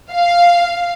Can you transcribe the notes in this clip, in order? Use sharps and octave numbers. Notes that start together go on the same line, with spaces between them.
F5